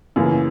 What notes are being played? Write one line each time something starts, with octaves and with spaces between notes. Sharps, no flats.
F#2 C#3 E3 A#3